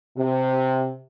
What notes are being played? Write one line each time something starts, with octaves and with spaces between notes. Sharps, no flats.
C3